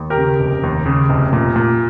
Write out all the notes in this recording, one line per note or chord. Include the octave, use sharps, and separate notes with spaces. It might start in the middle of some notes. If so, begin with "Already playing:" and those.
Already playing: D#2
G4 A#4
C#3
F1
D#2
C#3
F1
A#2
A#2